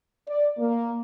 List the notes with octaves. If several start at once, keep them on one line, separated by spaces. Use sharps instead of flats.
D5
A#3